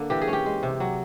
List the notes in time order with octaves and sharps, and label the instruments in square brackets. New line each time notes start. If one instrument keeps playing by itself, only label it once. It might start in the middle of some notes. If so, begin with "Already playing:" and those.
Already playing: [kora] D3 A#3
E3 G4
G#4
C#4
G4
G#3
C3
F#3